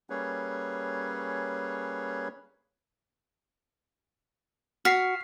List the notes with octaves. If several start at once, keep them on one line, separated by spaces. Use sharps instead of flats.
G3 A#3 C#4 G#4 B4 C#5
F#4 F6 B6 C7